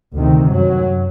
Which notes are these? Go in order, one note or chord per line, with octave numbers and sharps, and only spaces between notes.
D2 C3 D#3
F#2 F#3